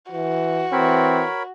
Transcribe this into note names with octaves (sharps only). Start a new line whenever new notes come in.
E3 F#4
E3 C4 A#4 C#5 B5